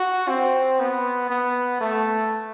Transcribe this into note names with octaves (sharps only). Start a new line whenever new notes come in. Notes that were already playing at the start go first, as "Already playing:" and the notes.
Already playing: F#4
C4
B3
B3
A3